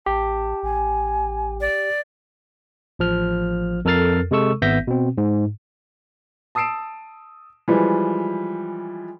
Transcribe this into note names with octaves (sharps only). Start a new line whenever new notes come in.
A1 G4 A5
A1 G#5
D5
A1 F3 F6
F2 A4 A#4 F6 A6 C7
C3 G#3 A4 C#6 E6
G#1 B3 E5 G6 A#6 B6
B2 C4
G#2
A5 D#6 E6 C7 D7 E7
E3 F3 G3 G#3